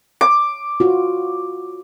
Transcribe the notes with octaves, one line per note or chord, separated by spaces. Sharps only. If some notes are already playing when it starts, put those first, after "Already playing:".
D6
F4 F#4